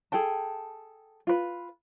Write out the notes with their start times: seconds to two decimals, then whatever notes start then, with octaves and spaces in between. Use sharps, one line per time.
0.12 G#4 A4 G5 A5
1.27 F4 B4